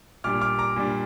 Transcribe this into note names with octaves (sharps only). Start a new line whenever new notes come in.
A#2 G3 D4 D6 F6
D6 F6
A#5 D6
A#2 G3 D4